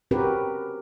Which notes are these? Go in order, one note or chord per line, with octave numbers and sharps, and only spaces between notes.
C4 C#4 F#4 G4 A#4 B4